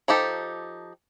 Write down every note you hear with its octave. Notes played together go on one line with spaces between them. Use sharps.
F3 D#4 G4 A4